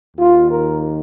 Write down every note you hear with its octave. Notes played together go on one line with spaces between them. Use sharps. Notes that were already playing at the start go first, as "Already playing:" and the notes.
D#2 D#3 F4
A#4